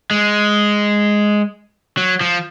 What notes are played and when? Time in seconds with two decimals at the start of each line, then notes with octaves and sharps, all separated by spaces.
0.11 G#3
1.97 F#3
2.21 F3